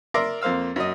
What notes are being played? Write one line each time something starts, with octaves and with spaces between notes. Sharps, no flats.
A#4 D5 E5 A#5 C6 D6
F2 A#3 C5 F5 E6
F#2 D#5